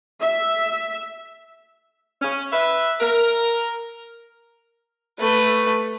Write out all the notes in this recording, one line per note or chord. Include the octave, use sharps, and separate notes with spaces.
E5
C#4
B4 E5
A#4
A3 B4